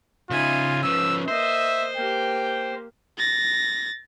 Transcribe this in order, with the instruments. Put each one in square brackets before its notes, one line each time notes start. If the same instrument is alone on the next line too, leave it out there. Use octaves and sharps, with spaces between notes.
[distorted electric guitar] C#3 E5 [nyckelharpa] D#4 G#5 [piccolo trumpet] F4
[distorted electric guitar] F3 C#4 [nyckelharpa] B4 [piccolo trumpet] E6
[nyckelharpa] A#3 D#5 [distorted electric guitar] C5 [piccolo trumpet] E5
[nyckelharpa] A#3 G4 [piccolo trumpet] G5
[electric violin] A6 A#6